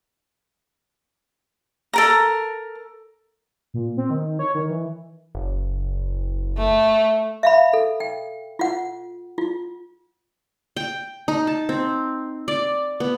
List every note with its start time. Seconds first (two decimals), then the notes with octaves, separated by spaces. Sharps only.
1.93 A4 A#4 A#5
3.74 A#2
3.97 C4
4.10 D#3
4.39 C#5
4.55 D#3
4.69 E3
5.35 F#1
6.58 A3
7.43 E5 F5 B5
7.73 A4
8.00 G5
8.59 F4 F#5
9.38 F4
10.76 G5
11.28 D#4
11.47 A5
11.69 C4
12.48 D5
13.00 B3